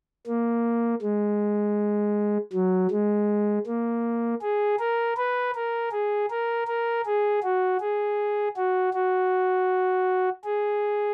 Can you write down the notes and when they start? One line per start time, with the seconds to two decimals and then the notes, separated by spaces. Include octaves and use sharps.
0.26 A#3
1.02 G#3
2.53 F#3
2.91 G#3
3.66 A#3
4.42 G#4
4.79 A#4
5.17 B4
5.55 A#4
5.92 G#4
6.30 A#4
6.67 A#4
7.06 G#4
7.43 F#4
7.81 G#4
8.57 F#4
8.93 F#4
10.44 G#4